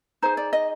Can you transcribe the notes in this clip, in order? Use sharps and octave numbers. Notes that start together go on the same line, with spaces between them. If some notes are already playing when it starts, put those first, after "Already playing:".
D#4 G#4 C5
D5
D#5